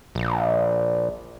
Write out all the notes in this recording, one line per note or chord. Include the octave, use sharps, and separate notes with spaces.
A#1